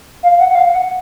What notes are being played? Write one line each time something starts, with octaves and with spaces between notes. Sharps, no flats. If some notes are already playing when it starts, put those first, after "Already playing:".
F5
F#5
F#5
F5
F#5